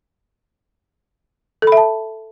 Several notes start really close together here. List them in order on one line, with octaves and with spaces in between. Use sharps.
A4 B5 E5 A5